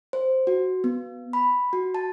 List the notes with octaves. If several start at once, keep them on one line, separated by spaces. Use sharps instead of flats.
C5
F#4
B3
B5
F#4
A5